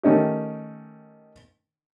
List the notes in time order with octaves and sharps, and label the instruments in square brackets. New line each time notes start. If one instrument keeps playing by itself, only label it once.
[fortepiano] D#3 A3 C#4 D#4 G4